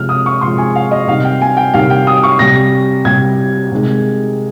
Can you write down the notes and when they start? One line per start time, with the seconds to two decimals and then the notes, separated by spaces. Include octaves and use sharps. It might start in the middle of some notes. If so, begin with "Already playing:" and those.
Already playing: C3 F3 G#3 F6
0.09 D#6
0.26 C#6
0.41 C3 F3 G#3 C6
0.58 G#5
0.75 F5
0.91 D#5
1.08 C3 D#3 G3 F5
1.24 G5
1.41 G#5
1.57 G5
1.74 C3 D#3 G3 F5
1.90 G5
2.07 D#6
2.23 C#6
2.39 C3 G3 A#6
3.05 C3 G3 G#6
3.71 C3 D#3 G#3